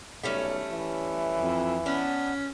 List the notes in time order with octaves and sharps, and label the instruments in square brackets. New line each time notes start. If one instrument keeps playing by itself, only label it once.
[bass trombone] B1 [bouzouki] G3 A3 C#4
[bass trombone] E3
[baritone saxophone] F2
[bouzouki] B3 D4 [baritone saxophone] C#4